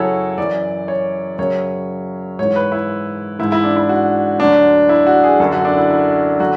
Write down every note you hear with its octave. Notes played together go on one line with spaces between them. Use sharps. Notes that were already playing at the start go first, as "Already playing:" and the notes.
Already playing: F#2 C#3 F#3 E4 F#4 G#4 A4 C#5
F#2 E3 D5
C#5
F#2 C#3 F#3 C#5
G#2 E3 C#5
B4
E4
G#2 E3 E4
E4
D4
E4
F#4
D2 D3 F#3 D4
E4
F#4
G#4
F#2 D3 F#3 A4
F#4
D4
E4
E4
D3 F#3 F#4